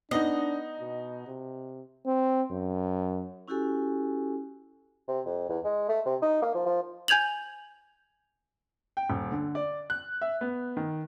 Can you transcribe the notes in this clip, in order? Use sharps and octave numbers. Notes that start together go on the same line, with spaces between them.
B3 D4 D#4 D#5
B2
C3
C4
F#2
C#4 E4 F#4 G4 A4 G#5
C3
F2
E2
G#3
A3
C3
D#4
A#3
F3
F3
G#5 G6 G#6 F7 F#7
G5
D#1
D3
D5
F#6
E5
B3
D#3